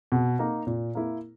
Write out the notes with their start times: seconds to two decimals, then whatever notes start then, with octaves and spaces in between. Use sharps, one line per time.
0.12 B2
0.39 A#3 D#4
0.67 A#2
0.95 A#3 E4